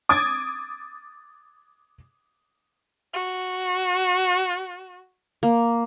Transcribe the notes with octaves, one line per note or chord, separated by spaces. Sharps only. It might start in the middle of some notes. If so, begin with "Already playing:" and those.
D6 D#6 G#6 A6 D7
F#4
A#3